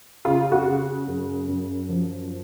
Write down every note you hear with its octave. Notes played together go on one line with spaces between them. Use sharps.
C#3 F4
F#4
C#3
F#2
F#2
F3